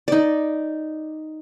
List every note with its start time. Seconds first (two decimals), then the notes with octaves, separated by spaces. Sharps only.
0.08 D#4 D5